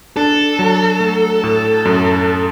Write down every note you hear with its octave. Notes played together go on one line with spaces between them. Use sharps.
D4 A4
F#3
A3
A2
F#2